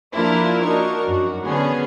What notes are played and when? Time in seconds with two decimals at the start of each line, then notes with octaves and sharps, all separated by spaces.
0.13 F3 A#3 D4 E4 F4 A#4
0.63 D4 D#4 F#4 A#4 C#6
1.05 F#2 F#4
1.44 D3 B3 C#4 G#4